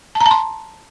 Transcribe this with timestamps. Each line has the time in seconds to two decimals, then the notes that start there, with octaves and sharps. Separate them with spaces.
0.15 A5
0.21 A#5
0.26 A5
0.31 C6